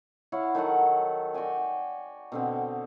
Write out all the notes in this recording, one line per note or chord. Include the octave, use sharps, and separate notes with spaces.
E4 C#5 F5 F#5
D#3 F#3 A4 F#5
F#4 D5 G5 G#5
B2 D3 C4